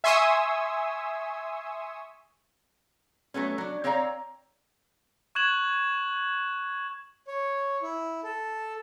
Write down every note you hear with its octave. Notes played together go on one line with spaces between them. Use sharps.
E5 G#5 C6 C#6 D#6 E6
F#3 A3 B3 C#4
F#3 D4
C4 C#5 D5 F5 A#5
C#6 F#6 G#6 E7 F#7
C#5
E4
A4